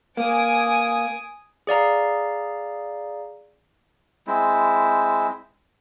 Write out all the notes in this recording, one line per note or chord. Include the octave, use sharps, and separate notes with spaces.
A#3 G#5 D#6 D7
G#4 D5 F5 A#5
G#3 C4 E4